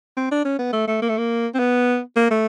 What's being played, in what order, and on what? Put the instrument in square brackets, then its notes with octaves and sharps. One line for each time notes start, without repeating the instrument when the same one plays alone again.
[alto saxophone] C4
D4
C#4
B3
A3
A3
A#3
A3
A#3
C4
B3
A#3
A3